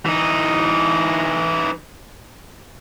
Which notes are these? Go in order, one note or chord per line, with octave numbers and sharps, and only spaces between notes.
E3 D#4